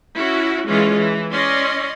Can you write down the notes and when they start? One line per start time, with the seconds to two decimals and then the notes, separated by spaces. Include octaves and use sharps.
0.16 C#4 E4 F#4
0.67 E3 G#3 C#4 F4
0.95 E3
1.32 C#4 D5 D#5 C6